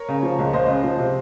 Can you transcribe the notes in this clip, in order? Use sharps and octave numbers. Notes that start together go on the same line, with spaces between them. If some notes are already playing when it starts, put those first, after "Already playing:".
Already playing: A#4 C#5
C#3
F3
C#2
C#2 C5 D#5
C#3
F3
C3